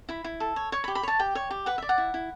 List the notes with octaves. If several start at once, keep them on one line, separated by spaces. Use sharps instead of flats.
E4 B5
E4
A4
C#5
C#5 C#6
B5
G4
B5
C#5 A5
G4 G5
C#5
G4
B4 F#5
D5 E5
F#5
E4
E4